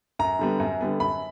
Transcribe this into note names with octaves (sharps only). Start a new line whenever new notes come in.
F#2 A#5
D3 G3 B3
F#2
D3 G3 B3
F#2 B5